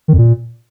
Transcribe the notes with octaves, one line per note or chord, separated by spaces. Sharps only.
D#3
F2
A#2